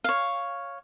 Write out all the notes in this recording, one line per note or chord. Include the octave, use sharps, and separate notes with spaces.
C#5 F5